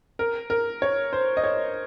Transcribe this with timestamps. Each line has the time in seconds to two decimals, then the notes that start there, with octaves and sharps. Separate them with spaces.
0.19 A#4
0.50 A#4
0.82 C#5
1.13 C5
1.37 D#5
1.44 C#5